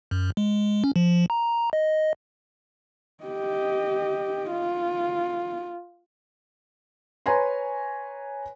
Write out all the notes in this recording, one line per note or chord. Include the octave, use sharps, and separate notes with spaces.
F#2
G#3
C#4
F3
A#5
D#5
G4 D#5
F4
B4 C#5 G#5 A#5 C6